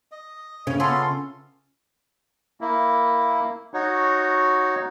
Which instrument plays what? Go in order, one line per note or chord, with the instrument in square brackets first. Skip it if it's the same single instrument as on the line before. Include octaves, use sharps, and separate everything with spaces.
[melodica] D#5
[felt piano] C#3 [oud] C#4
[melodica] B3 A4 C6 [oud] C#4 F4
[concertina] A#3 E4
D#4 F#4 C#5